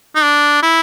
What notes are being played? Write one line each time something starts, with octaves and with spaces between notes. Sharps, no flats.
D#4
D4
E4